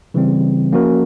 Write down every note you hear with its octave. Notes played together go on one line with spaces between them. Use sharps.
C#3 E3 G3 C4
F3 A#3 C#4 F#4 A#4